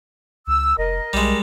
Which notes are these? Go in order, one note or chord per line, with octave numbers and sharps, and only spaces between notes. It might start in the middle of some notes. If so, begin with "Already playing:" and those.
C#2 E6
F1 A#4 D#5
B1 G3 G#3